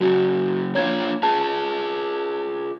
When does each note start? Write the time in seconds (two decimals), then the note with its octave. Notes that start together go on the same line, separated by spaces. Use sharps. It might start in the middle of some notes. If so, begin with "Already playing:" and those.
0.01 F#2 C#3 F#4
0.75 A#3 D4 F4 C#5 G#6
1.23 F4 G#4 A5